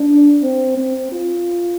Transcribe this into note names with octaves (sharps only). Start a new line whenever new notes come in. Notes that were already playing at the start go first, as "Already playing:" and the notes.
Already playing: D4
C4
C4
F4